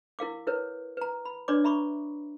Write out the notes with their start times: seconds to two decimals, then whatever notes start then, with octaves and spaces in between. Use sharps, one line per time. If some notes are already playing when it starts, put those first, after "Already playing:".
0.19 E4 A#4 F5 D6
0.47 E4 A#4 B4 C#5
0.97 B4 A#5
1.25 B5
1.48 D4 B4 C#5 D5 C6 D6
1.64 E5 A#5 B5 C#6 D6